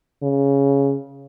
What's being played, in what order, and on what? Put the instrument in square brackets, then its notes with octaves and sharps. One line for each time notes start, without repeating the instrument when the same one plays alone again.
[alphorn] C#3